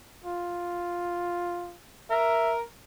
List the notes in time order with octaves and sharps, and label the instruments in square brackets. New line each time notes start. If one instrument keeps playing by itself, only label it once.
[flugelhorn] F4
[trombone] A#4 [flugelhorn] E5